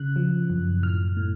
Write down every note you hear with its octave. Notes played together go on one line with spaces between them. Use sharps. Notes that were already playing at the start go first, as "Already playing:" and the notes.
Already playing: C#3 F#6
F3
F#2
A2 F6
A2